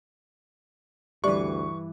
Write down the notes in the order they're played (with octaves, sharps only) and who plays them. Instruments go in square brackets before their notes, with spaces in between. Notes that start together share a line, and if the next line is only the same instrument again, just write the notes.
[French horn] D2 [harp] G2 E3 [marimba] G4 D5 E5 [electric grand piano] C#6